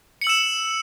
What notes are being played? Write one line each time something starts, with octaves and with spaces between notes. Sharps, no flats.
E6 C#7 E7 F#7